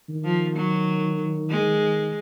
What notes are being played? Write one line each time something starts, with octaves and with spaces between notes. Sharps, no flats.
D#3
F3
F#3
G#3